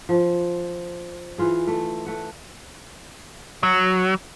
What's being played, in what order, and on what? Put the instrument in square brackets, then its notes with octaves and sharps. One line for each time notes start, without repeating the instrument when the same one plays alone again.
[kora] F3
E3 F4 G#4
A3
A3 F#5
[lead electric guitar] F#3